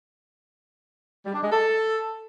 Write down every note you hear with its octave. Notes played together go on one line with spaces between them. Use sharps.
G3
D4
G#3
A4